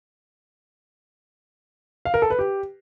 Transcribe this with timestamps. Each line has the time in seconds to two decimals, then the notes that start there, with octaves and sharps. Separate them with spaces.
2.05 F5
2.14 A#4
2.22 A4
2.30 B4
2.39 G4